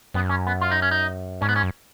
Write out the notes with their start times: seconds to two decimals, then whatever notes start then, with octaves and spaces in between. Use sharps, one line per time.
0.14 F#2 B3
0.30 C#4
0.47 B3
0.61 F4
0.71 D#4
0.82 C#4
0.91 D#4
1.41 G#2 C#4
1.49 B3
1.56 C#4
1.63 F#2